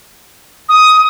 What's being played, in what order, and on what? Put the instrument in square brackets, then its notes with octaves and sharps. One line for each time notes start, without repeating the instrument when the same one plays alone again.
[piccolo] D#6